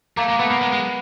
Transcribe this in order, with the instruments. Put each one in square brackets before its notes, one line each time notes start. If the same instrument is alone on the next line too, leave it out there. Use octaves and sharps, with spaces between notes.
[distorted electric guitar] A3 [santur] A#3
[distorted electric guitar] G#3
[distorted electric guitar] A3 [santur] B3
[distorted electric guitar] A#3
G#3
G#3